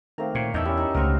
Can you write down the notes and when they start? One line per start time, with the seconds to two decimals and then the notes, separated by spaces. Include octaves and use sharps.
0.18 D#3 A3 A#3 C4 A#5
0.35 A#2 C#5
0.54 E2 D#4 D5 E5 A5 A#5 G6
0.65 C#4 E4 G4
0.77 D#4
0.95 C#2 A3 C4 F#4 A#4